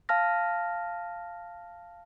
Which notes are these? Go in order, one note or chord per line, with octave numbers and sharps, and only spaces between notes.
F5 A5 F6 A#6